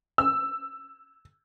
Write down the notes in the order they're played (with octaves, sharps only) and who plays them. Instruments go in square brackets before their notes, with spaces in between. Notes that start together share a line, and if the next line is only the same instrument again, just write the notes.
[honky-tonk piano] E6